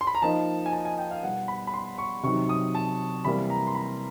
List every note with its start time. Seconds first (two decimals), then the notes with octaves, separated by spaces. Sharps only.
0.01 C6
0.07 B5
0.15 A#5
0.22 F3 A#3 D#4 A5
0.66 G#5
0.73 A5
0.85 G#5
0.98 G5
1.11 F5
1.23 B2 G3 B3 F#5
1.48 B5
1.67 B5
1.74 C6
1.98 C#6
2.23 C3 D#3 F#3 C#6
2.49 D#6
2.75 A5
3.25 C3 E3 G3 A#3 B5
3.50 A#5
3.67 C6
3.75 B5